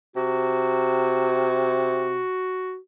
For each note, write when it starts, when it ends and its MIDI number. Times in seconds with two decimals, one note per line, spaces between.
0.16 2.24 48
0.16 2.77 66